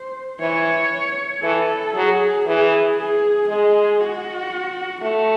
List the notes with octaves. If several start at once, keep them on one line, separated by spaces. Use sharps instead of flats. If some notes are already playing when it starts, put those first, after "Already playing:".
Already playing: C5
E3 C#5
E3 A4
F#3 G#4
E3 G#4
G#4
G#3 G#4
F#4
A3 F#4